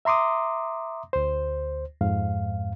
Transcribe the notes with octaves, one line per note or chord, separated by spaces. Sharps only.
E5 A#5 C6 D6 D#6
D2 C5
F2 G#2 F5